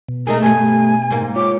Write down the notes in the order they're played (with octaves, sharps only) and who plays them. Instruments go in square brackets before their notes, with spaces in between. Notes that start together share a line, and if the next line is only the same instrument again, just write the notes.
[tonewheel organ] B2
[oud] A3 D#4 G#4 [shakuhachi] A#4
[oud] G2 A3 [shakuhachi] G#5
[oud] G#2 A#3
[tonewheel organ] F4 C#5 [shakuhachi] D6